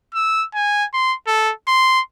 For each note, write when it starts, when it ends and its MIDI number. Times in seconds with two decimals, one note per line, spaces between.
0.15 0.45 88
0.55 0.85 80
0.94 1.14 84
1.27 1.52 69
1.68 2.01 84